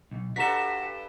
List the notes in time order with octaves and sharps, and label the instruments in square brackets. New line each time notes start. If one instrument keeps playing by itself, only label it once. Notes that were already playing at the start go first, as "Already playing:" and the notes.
[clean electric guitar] B1
[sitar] G2 A4 [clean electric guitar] F#4 [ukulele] F#5 A#5 [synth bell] B6 E7